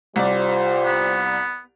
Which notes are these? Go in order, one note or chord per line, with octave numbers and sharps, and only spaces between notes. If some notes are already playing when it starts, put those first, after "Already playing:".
C2 G3 F4 C5 D5
B3